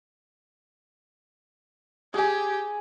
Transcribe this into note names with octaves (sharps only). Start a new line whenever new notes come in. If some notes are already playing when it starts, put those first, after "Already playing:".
G4 G#4 G#5